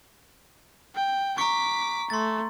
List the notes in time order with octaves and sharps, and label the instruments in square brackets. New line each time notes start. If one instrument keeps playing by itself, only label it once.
[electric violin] G5
[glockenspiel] A#5 C#6 [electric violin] D6 B6
[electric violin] A3 [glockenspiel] C6 A6